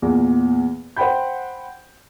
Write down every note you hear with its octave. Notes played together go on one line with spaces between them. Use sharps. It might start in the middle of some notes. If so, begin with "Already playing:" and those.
E2 A#2
C5 F#5 G5 B5 G6